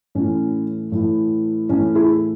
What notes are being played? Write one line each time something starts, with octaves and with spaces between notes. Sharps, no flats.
A2 E3 C#4
A2 E3
A2 E3 C#4
E4 G#4